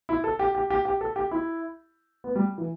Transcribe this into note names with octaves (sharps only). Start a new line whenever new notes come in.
E4
A4
G4
G4
G4
G4
A4
G4
E4
B3
G3
E3